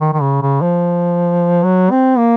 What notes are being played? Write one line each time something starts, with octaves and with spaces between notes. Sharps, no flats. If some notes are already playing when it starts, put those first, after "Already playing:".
D#3
D#3
C#3
C#3
F3
F#3
C4
A#3